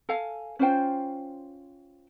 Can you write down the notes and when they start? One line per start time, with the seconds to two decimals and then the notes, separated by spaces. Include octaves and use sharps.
0.09 A4 F5 G#5
0.59 C#4 F4 C5 G5